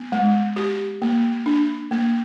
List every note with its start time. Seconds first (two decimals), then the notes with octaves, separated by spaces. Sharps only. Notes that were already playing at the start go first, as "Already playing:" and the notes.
Already playing: B3
0.12 G#3
0.56 G4
1.02 A#3
1.46 D4
1.91 A#3